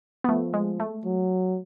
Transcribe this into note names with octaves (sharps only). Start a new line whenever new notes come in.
B3
F3 A3
G#3
A3
F#3